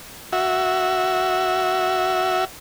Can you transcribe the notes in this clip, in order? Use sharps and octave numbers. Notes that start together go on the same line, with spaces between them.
F#4 E5